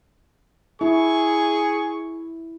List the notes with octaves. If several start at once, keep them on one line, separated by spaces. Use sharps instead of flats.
E4 G#4 C#6